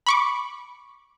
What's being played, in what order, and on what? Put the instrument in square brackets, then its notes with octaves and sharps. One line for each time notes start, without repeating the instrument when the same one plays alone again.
[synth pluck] B5 C#6 D6